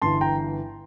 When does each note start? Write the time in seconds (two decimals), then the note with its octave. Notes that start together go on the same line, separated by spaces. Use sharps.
0.02 G1 G2 E3 A5 C6
0.21 G5 A#5